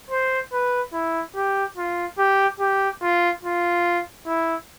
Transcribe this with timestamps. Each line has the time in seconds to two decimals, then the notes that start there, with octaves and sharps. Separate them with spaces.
0.11 C5
0.52 B4
0.93 E4
1.35 G4
1.77 F4
2.18 G4
2.60 G4
3.02 F4
3.43 F4
4.26 E4